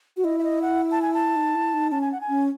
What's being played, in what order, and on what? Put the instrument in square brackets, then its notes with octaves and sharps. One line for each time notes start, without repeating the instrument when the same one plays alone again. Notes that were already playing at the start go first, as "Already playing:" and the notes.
[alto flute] F#4
[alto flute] E4 [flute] D#5
[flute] E5
D#5
F#5
A5
G#5
A5
[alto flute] D#4
E4
D#4
[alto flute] C#4 [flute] A5
[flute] G#5
F#5
G#5
[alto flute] C#4